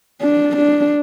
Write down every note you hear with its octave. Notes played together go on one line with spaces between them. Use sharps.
D4
D4